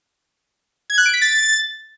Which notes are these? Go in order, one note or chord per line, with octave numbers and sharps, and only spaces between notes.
G#6
F#6
D7
B6
A6